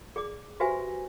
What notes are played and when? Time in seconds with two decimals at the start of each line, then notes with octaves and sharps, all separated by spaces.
0.16 G#4 D5 D6
0.60 F#4 G4 B4 C5 E5 G#5